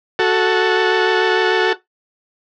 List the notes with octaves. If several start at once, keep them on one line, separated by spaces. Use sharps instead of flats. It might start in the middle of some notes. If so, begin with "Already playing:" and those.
F#4 A4